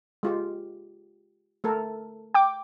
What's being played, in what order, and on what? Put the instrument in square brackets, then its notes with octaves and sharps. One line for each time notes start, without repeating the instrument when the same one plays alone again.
[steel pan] G#3 F4 G4
A3 A4 A#4
[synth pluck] G5 D6